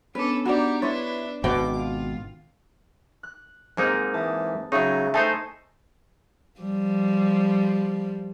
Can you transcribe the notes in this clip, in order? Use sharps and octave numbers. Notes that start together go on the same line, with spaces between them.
B3 C#4 D4 A4 B4
B3 D4 D#4 F#4 G4 D5
D4 E4 B4 C#5 C6 A6
G#1 B2 G5 D6
F4
F#6
G#2 G#3 A#3 C4 D#4 G#4
E3 A5 D#6
C#3 F#3 D#4 E5 C#6
A3 D#4 C5 G#5 A5
F3 G3